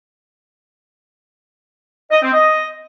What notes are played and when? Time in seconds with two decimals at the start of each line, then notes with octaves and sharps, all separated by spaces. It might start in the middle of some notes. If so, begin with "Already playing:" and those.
2.11 D#5
2.22 C4
2.34 D#5